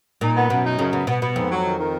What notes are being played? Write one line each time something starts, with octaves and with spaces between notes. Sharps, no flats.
A#2 D#4
B3
F#2 B2
D#4
F#2 C#3
C#3 B3
B2 B3
B2 B3
F2 G#2
F#3
D#3
D#3